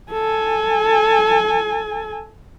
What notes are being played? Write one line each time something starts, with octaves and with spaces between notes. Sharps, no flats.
A4 G#5